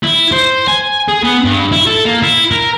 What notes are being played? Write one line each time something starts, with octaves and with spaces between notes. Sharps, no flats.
E4
C5
G#5
G#4
B3
G2
E4
A4
A#3
E4
A#4